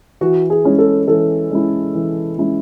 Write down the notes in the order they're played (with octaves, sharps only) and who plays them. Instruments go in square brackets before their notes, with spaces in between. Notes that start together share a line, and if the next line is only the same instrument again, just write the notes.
[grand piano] E3 [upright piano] F#4
[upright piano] G#4
[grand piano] G#3 C#4 E4
[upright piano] A4
[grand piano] E3 [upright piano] A4
[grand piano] G#3 C#4 E4
E3
G#3 C#4 E4